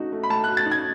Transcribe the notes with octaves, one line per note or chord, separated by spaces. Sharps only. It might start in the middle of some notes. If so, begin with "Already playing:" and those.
Already playing: A3 D#4 F#4
A3
B5
A3 A5
F#4 F#6
A6
D#4
G#6